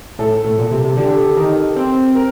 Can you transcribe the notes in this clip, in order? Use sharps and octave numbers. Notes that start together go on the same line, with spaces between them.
A2 A4
A2
A#2
C3
C3
D3 G4
A4
A4
D#3 A#4
C4
A#4